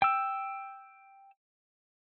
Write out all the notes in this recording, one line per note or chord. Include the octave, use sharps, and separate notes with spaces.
G5 E6